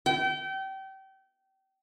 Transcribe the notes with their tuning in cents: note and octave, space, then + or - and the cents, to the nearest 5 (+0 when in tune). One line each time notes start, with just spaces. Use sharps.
G5 -30